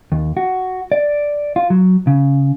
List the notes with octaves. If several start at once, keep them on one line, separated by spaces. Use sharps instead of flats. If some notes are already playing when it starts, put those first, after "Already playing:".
D#2
F#4
D5
F4
F#3
C#3